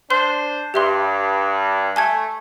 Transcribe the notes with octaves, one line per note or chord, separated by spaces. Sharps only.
D4 C5 C6
G2 G4 E5 C6
A3 G#5 A5 G#6